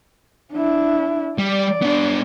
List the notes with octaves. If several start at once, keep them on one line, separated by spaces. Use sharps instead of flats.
D4 E4
G3 D5
B3 D4